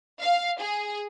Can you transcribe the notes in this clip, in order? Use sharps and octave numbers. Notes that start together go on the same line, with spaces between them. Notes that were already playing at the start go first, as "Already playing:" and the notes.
F5
G#4